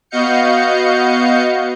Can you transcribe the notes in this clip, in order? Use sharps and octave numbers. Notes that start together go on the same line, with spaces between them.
B3 F#4 D#5 F5 G6 C#7